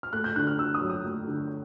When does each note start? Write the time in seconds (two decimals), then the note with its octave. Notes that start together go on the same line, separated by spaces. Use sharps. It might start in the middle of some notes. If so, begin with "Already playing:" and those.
0.03 F6
0.13 A3 F#6
0.24 G6
0.36 D3 F#6
0.47 F6
0.58 D3 E6
0.74 D#6
0.81 F#3
0.90 D#6
1.05 A3
1.28 D3